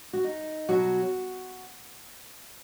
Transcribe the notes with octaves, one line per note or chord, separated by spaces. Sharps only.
F#4
D#4
B2 F#3 F#4